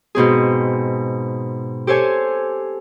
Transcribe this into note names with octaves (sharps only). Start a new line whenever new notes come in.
G#2 B2 C4 G#4
G4 A4 C5 C#5 G#5